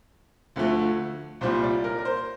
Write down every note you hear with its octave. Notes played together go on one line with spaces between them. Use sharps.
D2 D3 F3 A3
C2 A#2 G3 C5
D5
A#4
A#4
C5